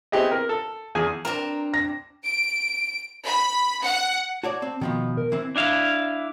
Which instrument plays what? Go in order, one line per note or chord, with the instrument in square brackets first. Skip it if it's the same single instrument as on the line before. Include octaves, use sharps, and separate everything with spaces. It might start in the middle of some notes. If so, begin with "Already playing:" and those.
[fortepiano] B3 C4 E4 G4 G#4 D#5
A#4
A4
E2 G#4 G#5
[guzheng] C4 D4 [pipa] A#4
[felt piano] A#6
[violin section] D7
B5
F#5
[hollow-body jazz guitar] F#4 C#5 D5 [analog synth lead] A5
[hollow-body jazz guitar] C4
[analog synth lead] B2 [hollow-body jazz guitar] D#3 F3 B3
[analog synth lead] A#4
[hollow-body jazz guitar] E3 C4
[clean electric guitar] D4 E4 F5